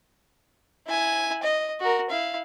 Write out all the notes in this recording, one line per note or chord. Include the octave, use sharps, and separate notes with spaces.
E4 G#5
D#5
F#4 A#4
E4 F5